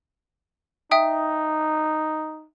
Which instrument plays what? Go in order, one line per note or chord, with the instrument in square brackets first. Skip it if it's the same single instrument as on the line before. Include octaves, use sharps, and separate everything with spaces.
[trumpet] D#4 [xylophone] E5 G5 D#6